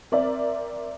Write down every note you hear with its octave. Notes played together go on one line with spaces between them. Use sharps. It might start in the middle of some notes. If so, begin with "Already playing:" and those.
C4 A#4 D5 E5